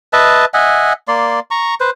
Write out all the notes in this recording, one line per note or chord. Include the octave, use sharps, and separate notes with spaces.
B4 D#5 E5 A5
D#5 E5 F#5 G#5
A#3 D5 C6
A#5 C#6
B4 C5